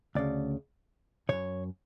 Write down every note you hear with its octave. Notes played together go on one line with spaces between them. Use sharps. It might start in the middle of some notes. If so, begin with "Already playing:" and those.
D2 C#3 D5
F#2 C#3 C#5